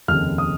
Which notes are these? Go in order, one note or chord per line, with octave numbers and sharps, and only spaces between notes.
F1 D#2 C#3 F6
D#6